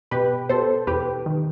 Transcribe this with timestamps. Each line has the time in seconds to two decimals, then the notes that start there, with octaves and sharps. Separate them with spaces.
0.11 B2 G4 B4
0.49 B2 A4 C5
0.87 E2 G4 B4
1.26 D#3